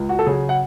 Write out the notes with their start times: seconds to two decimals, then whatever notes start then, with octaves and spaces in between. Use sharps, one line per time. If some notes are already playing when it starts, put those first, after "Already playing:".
Already playing: C#2
0.09 F#4
0.19 A4
0.26 C#3 F#3 G#4
0.49 F#5